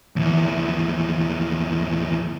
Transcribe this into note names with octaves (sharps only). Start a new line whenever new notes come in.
D#2 E3